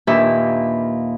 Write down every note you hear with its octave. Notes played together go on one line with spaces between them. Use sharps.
D#2 A#2 D4 G4 B4 E5